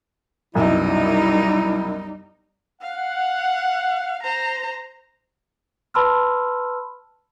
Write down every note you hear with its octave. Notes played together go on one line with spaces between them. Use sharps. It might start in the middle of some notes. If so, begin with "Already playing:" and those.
C2 F#2 B2 G3 D#4 E4
F5 F#5
C5 A#5
B4 A5 B5 C6 E6 F6